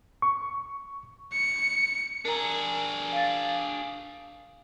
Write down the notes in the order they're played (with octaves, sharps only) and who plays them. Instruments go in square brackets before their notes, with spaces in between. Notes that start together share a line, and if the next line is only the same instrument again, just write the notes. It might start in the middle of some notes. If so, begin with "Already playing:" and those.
[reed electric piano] C#6
[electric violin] C#7
[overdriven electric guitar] D4 G#4 [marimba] A#4 A#5
[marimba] F5 A6